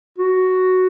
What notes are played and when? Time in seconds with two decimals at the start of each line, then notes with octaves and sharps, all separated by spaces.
0.18 F#4